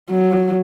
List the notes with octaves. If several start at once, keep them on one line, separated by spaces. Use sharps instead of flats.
F#3